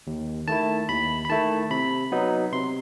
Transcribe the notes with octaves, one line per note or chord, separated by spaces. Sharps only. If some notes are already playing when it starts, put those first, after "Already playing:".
D#2
D#3 A3 E4 A5
D#2 B5
B5
D#3 A3 E4 A5
C3 B5
F#3 B3 D#4
C3 C6